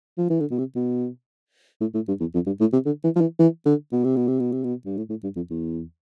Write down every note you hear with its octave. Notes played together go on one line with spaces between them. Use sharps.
F3
E3
D3
B2
C3
B2
A2
A2
G2
E2
F2
G2
A2
C3
D3
E3
F3
E3
E3
D3
B2
C3
B2
C3
B2
C3
B2
G2
A2
A2
G2
F2
E2